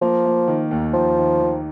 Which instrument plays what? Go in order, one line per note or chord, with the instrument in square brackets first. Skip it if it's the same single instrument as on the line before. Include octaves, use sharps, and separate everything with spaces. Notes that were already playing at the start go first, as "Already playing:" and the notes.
[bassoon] F3 [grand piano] A#3
[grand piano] A#3
D#3
D#2
[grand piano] D#2 [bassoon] F3
[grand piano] D#3
D#3